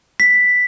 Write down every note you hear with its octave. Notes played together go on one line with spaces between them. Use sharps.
B6